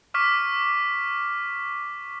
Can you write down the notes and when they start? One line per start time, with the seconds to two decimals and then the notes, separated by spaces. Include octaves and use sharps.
0.14 C#6 D6 F6 B6